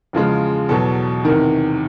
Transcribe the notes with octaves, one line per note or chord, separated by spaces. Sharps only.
E2 C#3 F3 G#3
E2 B2 F#3 A4
E2 C3 D#3 A#4